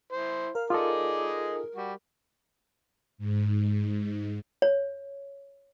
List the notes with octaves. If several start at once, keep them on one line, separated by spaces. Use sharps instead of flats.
E4 C5
A#4 F5
D#4 F4 G#4 A4 D5 D#5
G3 F#4
G#2
C#5